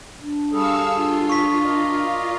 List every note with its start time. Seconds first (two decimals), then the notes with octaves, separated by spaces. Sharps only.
0.21 D4
0.52 G3 G#4 A4 F5 C#6 E6
0.94 D4 F4
1.29 C#6 B6
1.64 A#4 D5 D#5